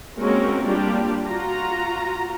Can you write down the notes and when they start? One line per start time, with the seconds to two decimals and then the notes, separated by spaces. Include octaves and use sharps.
0.18 G#3 A#3 C4 C#4 F#4 A#4
0.62 G3 A#3 D4 F4 G4
1.26 F4 F#4 A#5